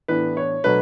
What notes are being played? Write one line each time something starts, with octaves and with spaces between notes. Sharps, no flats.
A2 E3 B3 D4 B4
C#5
B2 F#3 A3 D4 B4